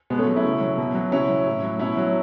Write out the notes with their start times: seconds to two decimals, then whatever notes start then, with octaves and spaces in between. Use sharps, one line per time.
0.10 B2 G#3 B3
0.19 A3 C#4
0.27 F#3
0.36 C#4 E4
0.44 C#3
0.61 F#3
0.78 B2
0.95 F#3
1.12 C#3 C#4 E4
1.29 F#3
1.46 A2
1.62 F#3
1.79 B2 C#4 E4
1.97 F#3